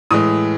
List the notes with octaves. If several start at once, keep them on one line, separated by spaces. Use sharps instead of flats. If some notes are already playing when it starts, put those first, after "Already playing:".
A2 E3 G#3 D#6